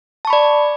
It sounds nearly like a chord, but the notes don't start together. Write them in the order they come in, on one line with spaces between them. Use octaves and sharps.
A5 C#6 B5 D5